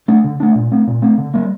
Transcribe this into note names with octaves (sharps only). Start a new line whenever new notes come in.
A3 D4
D3
A3 D4
A#2
A3 C4
A#2
A3 C4
D3
G3 A#3